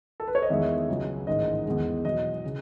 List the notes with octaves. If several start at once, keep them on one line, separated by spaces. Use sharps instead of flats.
A4
B4
C#5
D#5
E2 D#3 G#3 E5
C#2 C#3 F#3
A1 G#2 D#3 G#3 D#5
E2 D#3 G#3
E2 B2 F#3 D#5
C#3